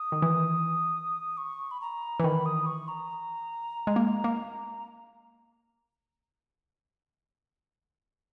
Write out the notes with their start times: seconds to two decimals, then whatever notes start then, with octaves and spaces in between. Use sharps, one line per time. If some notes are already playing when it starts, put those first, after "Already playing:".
Already playing: D#6
0.12 D#3
0.22 E3
1.37 C#6
1.71 B5
1.81 A#5
2.20 E3
2.23 D#3 B5
2.46 D#6
2.66 C#6
2.88 A#5
3.87 G#3
3.96 A#3
4.24 A#3